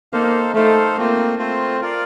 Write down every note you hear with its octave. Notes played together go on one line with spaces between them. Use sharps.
A#3 D#4 A4 C5 F5
A3 D#4 A4 C5 F5
A3 A#3 C4 F4 C5
A3 C4 F4 C5
F4 A#4 D5 F5